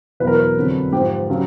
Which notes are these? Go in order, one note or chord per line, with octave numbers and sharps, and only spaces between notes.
E2 B2 F#3 B4
A#4
B4
F2 D3 F#3
G#2 F3 G4
C#3 F#3